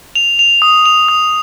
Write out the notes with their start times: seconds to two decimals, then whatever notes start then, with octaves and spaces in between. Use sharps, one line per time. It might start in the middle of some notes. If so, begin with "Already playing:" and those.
0.15 F7
0.39 F7
0.62 D#6
0.86 F7
1.09 D#6